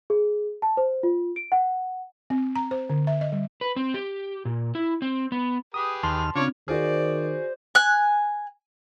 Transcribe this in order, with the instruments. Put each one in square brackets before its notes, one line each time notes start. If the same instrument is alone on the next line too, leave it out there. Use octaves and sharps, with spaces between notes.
[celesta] G#4
A5
C5
F4
D7
F#5
[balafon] C4
A#5
C5
D3
E5
D#5
G3
[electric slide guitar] B4
C4
G4
A#2
E4
C4
B3
[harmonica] G4 G#4 B4 [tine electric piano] D#6
[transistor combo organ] D#2 F6 [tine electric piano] A5 C6
[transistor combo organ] C#3 F4 [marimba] C4 D4 [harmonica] C#5 D5
[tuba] D#3 [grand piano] F#4 G#4 [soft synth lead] C5 [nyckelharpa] D5
[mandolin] G#5 F#6